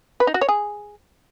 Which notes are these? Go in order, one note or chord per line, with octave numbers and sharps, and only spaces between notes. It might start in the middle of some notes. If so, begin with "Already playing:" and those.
B4
D#4
F#4
C#5
G#4